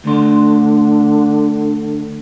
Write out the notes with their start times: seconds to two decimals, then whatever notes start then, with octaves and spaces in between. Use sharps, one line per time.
0.04 D2 D3 A3 C6